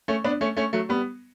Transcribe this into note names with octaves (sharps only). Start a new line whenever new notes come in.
A3 C#4
B3 D4
A3 C#4
A3 C#4
F#3 A3
G3 B3